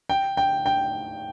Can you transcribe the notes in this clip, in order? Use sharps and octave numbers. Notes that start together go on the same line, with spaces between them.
G5
G5
G5